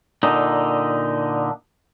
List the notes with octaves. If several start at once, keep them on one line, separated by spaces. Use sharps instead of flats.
A#2 D3 D#4